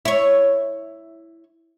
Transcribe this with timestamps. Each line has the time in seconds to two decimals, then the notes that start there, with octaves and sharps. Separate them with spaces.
0.05 E4 C#5